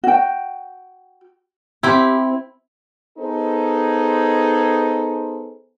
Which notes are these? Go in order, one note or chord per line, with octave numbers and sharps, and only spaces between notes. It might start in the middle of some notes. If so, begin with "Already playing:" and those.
F#4 G5
C4 E4 G4
B3 D#4 G#4 A4 C5